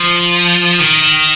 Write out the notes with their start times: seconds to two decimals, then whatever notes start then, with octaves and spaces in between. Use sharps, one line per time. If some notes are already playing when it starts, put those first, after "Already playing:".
Already playing: F3
0.80 D#3